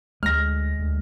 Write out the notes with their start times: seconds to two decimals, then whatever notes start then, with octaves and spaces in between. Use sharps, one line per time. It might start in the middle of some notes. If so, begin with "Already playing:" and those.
0.23 D2 G#3 F6 A#6
0.79 D2